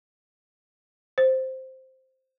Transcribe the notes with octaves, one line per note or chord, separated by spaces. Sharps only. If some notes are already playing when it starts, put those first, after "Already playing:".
C5